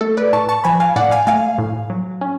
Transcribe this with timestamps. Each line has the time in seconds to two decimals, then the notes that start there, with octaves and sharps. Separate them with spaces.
0.01 A3 A4
0.17 B4 D5
0.33 A2 A5 C#6
0.49 A5 C#6
0.64 F3 G#5 B5
0.80 F5 G#5
0.96 A2 D5 F#5
1.11 F5 G#5
1.27 A3 F5 G#5
1.58 A2
1.90 F#3
2.21 C#4